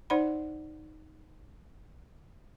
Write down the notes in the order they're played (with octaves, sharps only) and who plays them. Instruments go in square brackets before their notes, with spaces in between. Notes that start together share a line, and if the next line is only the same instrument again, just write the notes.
[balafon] D#4 C5 D5 F#5 B5